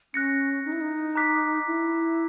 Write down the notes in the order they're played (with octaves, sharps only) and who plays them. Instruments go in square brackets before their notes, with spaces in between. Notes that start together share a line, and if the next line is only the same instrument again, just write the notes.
[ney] C#4 [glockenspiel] F#6 A#6 C#7
[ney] D#4
E4
D#4
[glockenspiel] A#5 D6 F#6 B6
[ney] E4